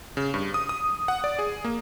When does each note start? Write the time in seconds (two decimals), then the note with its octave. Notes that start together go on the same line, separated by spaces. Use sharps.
0.17 C#3
0.34 G2
0.54 D#6
0.69 D#6
1.08 F#5
1.24 D5
1.39 G#4
1.64 A#3